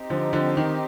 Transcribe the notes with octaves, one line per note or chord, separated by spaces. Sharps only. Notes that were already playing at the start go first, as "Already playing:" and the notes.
Already playing: C4 D#4 G4
D3 F3
D3 F3
D#3